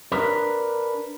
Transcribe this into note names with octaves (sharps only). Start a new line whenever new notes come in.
D4 A#4 B4